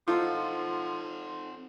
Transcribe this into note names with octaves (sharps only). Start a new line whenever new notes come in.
F3 C4 D#4 F4 A4 C5 F#5